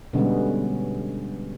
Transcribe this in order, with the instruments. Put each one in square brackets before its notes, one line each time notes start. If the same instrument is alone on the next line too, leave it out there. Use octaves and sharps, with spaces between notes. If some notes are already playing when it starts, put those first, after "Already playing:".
[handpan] B2 D3 G3 G#3 B3 C#4